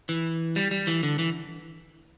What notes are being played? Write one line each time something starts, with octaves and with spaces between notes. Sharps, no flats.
E3
G3
G3
E3
D3
E3